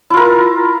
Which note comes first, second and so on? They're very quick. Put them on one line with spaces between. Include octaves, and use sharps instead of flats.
E4 F4 A#4